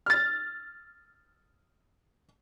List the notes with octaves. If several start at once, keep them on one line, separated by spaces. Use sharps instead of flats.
F6 A6